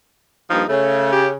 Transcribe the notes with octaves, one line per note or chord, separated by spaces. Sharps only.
G2 F3 A#3 D#4
C#3 A3
G4